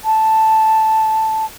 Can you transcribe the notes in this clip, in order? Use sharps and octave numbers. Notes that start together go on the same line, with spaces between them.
A5